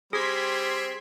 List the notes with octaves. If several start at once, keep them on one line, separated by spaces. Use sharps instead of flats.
G3 C4 G#4 C6 G#6 B6